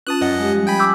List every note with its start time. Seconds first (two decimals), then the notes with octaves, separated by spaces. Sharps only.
0.07 C#4 F4 B4 A5 D#6 F#6
0.21 F#2 D#5 F#5
0.38 G#3 G4
0.54 F3 G3 G#3
0.67 G5 G#5 B5
0.79 D6 E6 G6